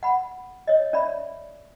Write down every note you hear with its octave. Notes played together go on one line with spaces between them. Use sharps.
F#5 B5
C#5 D#5
C#4 D5 E5 B5